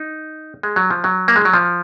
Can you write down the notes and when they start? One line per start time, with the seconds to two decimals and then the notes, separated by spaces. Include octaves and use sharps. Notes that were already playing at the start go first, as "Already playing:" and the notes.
Already playing: D#4
0.63 G#3
0.76 F#3
0.90 F3
1.04 F#3
1.28 A#3
1.36 G#3
1.45 F#3
1.54 F3